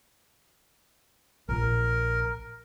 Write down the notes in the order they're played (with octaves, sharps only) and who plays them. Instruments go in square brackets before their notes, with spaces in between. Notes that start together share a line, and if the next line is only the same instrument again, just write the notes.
[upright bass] A#1 [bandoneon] A#4